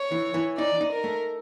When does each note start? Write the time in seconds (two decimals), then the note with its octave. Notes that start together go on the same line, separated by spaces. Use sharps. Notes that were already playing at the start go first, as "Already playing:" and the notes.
Already playing: C#5
0.12 E3
0.34 E3
0.58 D#4 D5
0.81 D#4
0.92 A#4
1.04 A3